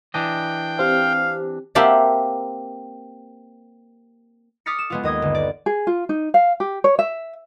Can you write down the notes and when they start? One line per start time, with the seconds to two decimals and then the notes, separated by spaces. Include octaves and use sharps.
0.14 E3 D4 D#5 G5
0.79 C4 G4 F5
1.75 A#3 C4 G4 E5 F#5 A5
4.66 D6 D#6 F6 A6 B6 C#7
4.79 E7
4.90 G#3 B3 F4
5.03 D#2 D#5 D#6 G#6
5.22 G1
5.35 D5
5.66 G#4
5.87 F4
6.09 D#4
6.34 F5
6.60 G4
6.84 C#5
6.99 E5